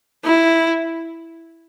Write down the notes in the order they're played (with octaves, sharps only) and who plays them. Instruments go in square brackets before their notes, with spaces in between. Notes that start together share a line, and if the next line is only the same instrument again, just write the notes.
[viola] E4